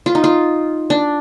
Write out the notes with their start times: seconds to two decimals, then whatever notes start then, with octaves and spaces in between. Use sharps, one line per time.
0.06 F4
0.15 D#4
0.24 F4
0.90 D4